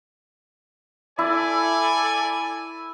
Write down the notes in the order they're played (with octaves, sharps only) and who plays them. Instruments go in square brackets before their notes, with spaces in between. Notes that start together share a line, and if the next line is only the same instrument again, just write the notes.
[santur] E4 [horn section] A4 D5 [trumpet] G#5